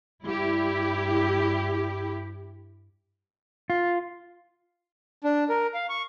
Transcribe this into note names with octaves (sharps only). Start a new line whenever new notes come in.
G2 E4 G4
F4
D4
A#4
F5
C#6